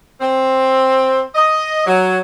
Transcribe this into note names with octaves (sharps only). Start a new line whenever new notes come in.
C4
D#5
F#3